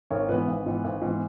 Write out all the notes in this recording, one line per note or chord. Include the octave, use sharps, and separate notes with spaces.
G#1 A#4 C#5
G#2 E3 B3 B4
G#1
G#2 E3 B3
G#1
G#2 E3 B3